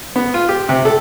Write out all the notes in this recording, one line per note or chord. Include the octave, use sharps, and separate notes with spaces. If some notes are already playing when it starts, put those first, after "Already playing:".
B3
F4
G4
C3
A4